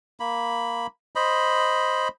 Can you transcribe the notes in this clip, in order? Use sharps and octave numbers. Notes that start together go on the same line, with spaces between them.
A#3 B5
C5 D#5 B5